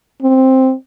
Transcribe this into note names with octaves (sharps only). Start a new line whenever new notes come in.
C4